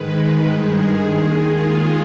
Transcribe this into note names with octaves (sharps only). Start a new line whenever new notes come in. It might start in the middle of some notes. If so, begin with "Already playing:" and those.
Already playing: G#2 D#3 G#3 B4
G2 D#3 G#3 G#4
D#2 D#3 G#3
F4